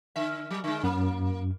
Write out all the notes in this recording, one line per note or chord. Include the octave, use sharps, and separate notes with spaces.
D3 E5
F#3
D3 G#3
F#2 A#3